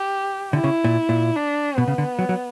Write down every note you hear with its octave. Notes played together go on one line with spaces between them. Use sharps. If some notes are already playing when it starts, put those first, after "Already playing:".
Already playing: G4
D3 E4
C#3
A#2
A#2
D4
B2 B3
C#3
D3
F#3
F#3